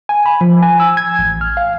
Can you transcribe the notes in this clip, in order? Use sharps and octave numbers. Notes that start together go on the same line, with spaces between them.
G#5
B5
F3
G#5
E6
G#6
A1
F6
F5